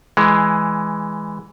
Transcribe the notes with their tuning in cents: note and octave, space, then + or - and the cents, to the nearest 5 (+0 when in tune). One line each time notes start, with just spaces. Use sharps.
E3 +0 G#3 +5